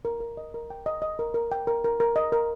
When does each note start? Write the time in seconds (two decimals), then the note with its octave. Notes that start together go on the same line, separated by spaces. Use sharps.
0.05 A#4
0.20 A#4
0.37 D#5
0.54 A#4
0.70 G5
0.86 D#5
1.02 D#5
1.19 A#4
1.34 A#4
1.52 G5
1.67 A#4
1.84 A#4
2.00 A#4
2.16 D#5
2.32 A#4